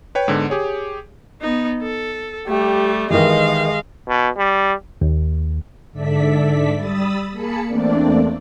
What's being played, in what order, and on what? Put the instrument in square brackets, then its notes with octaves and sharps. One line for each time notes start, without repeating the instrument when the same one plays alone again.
[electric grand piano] B4 C#5 G5
G#2 D3 B3
G4 G#4 C#5
[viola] B3 D#4
A4
[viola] G3 A3 [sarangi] G4
[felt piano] D#3 E3 [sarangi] G#3 [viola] D#5 F5
[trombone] B2
G3
[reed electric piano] D#2
[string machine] G#2 D3 A4 D5 E5 B6
G3 B5 D#6 E6 A6
A#3 G#4 A5 B5 C#7
E2 A3 A#3 C4 D4 D5